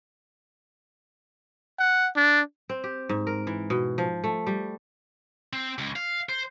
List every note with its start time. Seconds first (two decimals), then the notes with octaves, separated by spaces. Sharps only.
1.79 F#5
2.16 D4
2.69 C4
2.84 G4
3.09 G#2
3.27 A#4
3.47 E3
3.70 B2
3.98 F3
4.24 A3
4.47 G3
5.53 C4
5.78 C#2
5.96 F5
6.29 C5